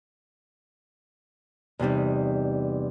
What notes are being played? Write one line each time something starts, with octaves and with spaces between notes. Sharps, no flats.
E2 C3 G3 D#4